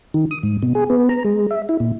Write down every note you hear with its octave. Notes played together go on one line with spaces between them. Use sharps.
D#3
D#6
G#2
B2
G#4
B3
A#5
G#3
E5
E4
A#2